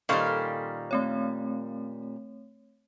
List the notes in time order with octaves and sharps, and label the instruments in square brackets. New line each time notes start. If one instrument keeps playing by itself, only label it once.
[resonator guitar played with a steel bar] A#2 D#3 G3 [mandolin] C#4 C5 F5 [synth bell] A4
[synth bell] A3 C4 C#5